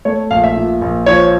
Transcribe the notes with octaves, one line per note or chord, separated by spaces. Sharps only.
A3 C#5
A#1 F5
E5
A#2
A#1
F3 C#5